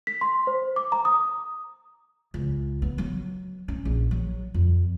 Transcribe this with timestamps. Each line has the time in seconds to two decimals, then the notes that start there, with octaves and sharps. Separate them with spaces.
0.07 B6
0.21 C6
0.47 C5
0.76 D6
0.92 A#5
1.05 D#6
2.34 C#2
2.82 B3
2.98 F#3
3.68 C#4
3.85 A#1
4.11 F#3
4.54 F2